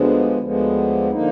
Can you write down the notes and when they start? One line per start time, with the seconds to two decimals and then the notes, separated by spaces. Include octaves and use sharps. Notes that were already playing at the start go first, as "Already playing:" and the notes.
Already playing: D2 D3 F3 G#3 B3
0.40 D2 D3 F3 G#3 B3
1.11 D3 F3 A#3 D#4